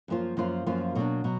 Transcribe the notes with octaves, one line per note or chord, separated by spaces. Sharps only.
F#2 F3 A#3 F4
F#2 F3 A#3 F4
F#2 F3 A#3 F4
B2 F#3 A#3 D4
B2 F#3